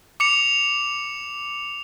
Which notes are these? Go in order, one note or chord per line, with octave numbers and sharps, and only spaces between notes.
D6 C#7 F7